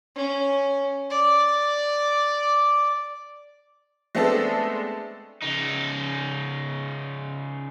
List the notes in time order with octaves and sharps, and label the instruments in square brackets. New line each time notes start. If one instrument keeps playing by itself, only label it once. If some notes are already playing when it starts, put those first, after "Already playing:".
[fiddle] C#4
D5
[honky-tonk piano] G#3 A3 B3 C4 D4 A4
[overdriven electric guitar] C#3 D#4